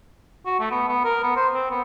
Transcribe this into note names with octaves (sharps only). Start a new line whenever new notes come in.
F#4
A3
B3
B3
A#4
B3
C5
C4
B3